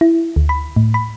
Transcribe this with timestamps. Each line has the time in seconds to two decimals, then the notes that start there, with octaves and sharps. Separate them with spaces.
0.01 E4
0.36 D2
0.49 B5
0.76 A2
0.94 B5